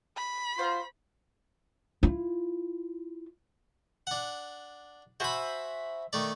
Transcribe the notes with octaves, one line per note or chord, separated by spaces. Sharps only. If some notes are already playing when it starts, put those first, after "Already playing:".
B5
F4 F#4 C5 C6
E4 F4
D4 F#5
F#4 C5 E5 G#5 B5
D#3 A3 D5